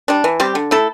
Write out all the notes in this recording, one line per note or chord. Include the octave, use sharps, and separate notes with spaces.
G3 D4
E3
G3 C4 G4
D3
A3 E4 A4